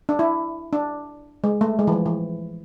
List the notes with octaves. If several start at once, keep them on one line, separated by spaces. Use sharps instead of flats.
D4
E4
D4
G#3
A3
G#3
E3
F3
E3